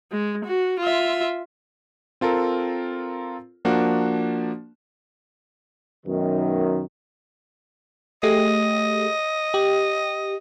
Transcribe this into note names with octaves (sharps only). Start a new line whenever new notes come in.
G#3
F#4
F4 E5
C4 F4 A4 A#4
F3 A#3 D4 F#4
F#2 B2 D#3
A3 G4 G#4 D#5
G4